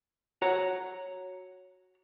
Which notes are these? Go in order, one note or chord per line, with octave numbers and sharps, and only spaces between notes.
F#4 C#5 F#5 A#5